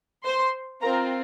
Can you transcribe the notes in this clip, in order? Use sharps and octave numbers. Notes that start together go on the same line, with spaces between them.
C5 C6
C4 F4 A#4 A#5